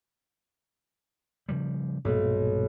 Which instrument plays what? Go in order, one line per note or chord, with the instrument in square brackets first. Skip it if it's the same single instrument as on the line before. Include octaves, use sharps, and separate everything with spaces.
[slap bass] C#3 F3 G3
[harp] B1 [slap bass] G2 A#2